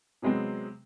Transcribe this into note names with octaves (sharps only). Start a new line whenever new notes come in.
C3 F#3 G#3 B3 C4